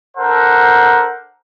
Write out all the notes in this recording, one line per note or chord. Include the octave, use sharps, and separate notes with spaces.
D4 A4 A#4 C5 F#5 A#5